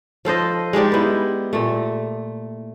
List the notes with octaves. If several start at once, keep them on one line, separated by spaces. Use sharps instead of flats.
F3 A4 C5 D#5
G#3 D#4 G4 D5
B3 E4
A#2 A3